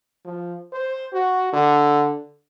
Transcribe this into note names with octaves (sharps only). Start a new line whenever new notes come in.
F3
C5
F#4
D3